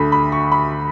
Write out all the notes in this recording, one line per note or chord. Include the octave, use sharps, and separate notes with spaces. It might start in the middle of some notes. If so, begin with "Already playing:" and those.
Already playing: D2 D3 A3 B5
B5
C#6
B5